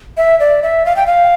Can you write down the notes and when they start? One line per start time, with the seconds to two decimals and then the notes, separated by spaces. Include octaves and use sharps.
0.17 E5
0.40 D5
0.63 E5
0.86 F5
0.96 G5
1.07 F5